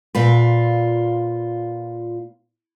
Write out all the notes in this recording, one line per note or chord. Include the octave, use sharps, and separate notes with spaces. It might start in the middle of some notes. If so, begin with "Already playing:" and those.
A#2 F4 B4